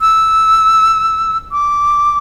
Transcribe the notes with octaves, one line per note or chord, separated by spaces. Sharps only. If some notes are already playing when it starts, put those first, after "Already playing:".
E6
D6